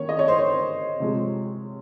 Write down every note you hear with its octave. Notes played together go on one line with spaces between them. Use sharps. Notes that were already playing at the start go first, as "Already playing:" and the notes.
Already playing: D#3 A#3 C#4 C#5
D#5
C#5
C5
C#5
C3 F3 G#3